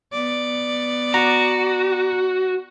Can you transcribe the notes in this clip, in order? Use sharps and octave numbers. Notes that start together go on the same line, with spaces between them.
B3 D5
F#4 A#5